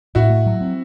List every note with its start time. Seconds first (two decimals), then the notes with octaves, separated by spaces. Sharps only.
0.15 A2 E4 F#4
0.30 A3
0.46 F#3
0.61 C4